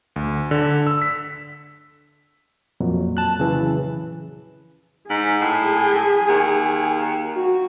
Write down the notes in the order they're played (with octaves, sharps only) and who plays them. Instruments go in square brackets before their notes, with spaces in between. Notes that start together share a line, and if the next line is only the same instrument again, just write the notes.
[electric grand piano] D2
D3
E6
B6
[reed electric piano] F2 A#2 F#3
[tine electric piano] A5 F#6
C#3 E3
[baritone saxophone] G#2 [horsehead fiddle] G#4
[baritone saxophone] A2
D#2
[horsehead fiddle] F#4